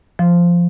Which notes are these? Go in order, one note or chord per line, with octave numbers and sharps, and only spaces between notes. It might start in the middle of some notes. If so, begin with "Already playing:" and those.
F3